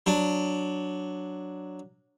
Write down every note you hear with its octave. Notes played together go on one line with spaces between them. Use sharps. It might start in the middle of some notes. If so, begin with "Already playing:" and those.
F#3 D4